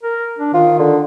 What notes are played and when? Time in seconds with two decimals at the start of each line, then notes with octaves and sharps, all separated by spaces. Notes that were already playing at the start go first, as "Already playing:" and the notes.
0.03 A#4
0.39 D4
0.54 D#3 F4
0.79 D3